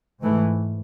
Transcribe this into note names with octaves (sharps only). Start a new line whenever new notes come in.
G#2 E3 A3